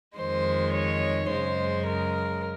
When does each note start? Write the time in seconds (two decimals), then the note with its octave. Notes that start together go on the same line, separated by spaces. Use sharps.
0.17 F2 D#3 G#3 C5
0.73 C#5
1.29 F#2 C#3 G#3 C5
1.86 A#4